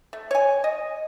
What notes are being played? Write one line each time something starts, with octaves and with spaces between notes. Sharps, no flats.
A3
C#5 G#5
D#5